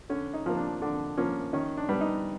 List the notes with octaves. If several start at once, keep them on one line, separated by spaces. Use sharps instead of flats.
D3 C#4
D#4
F3 A#3
D4
D3 D4
F3 A#3 C#4
D#3 C#4
D4
G3 B3
D#4